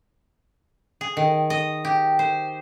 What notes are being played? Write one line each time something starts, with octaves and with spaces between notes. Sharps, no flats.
G#4
D#3
D#5
G4
C5